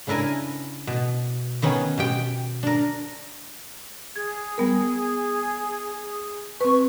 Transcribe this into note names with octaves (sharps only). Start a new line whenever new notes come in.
C#3 D4 E4 A#4 G#5
B2
D#3 B3 C#4
B2 G4 G5
D4 A#4
G#4 G#6
G3 B3 A#4
C4 B4 C#6